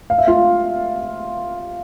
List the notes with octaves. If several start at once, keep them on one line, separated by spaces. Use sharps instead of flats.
F5
E5
F4 F5